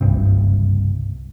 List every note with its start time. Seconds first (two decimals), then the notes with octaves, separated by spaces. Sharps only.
0.01 F#1 C2 G2 C3